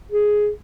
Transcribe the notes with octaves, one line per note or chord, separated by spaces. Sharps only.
G#4